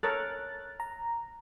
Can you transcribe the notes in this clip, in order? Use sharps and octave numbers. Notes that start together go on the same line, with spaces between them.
A4 A#4 C#5 F#6 A6
A#5